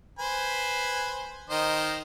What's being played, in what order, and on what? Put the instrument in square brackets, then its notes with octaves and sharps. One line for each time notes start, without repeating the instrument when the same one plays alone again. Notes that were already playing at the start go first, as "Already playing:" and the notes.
[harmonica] B4 C5 G#5
D#3 C5 D#5